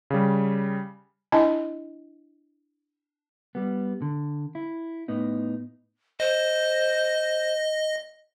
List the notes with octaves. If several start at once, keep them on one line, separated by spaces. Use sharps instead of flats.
C#3 G3
D4 E4 D#5 G#5 A5
G3 B3
D3
E4
A2 B3 D#4
C5 D#5